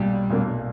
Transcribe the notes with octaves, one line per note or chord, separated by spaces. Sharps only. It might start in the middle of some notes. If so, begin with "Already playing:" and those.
Already playing: B1 A#2 F#3 G3 D4
B1 A#2 F#3 A#3 D4